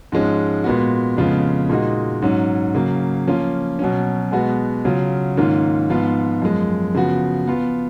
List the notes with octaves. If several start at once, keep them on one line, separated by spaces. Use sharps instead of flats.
G#2 F3 G#3 C#4
A#2 G#3 B3 F#4
F2 C#3 G#3 B3 F4
A#2 G#3 D#4 F#4
G#2 F#3 C#4
C#3 F#3 A#3
F3 A#3 C#4 F4
B2 F#3 C#4
B2 G#3 B3 F#4
C#3 F#3 C#4 F4
G#2 D#3 A#3 C#4 F4
G#2 F3 B3 F4
F#2 F3 G#3
C#3 F3 B3 F#4
F3 B3 F4